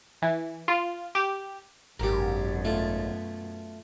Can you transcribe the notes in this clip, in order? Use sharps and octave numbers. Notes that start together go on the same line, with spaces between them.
E3
F4
G4
G#1 F#2 B2 G4 A#4
A3 F4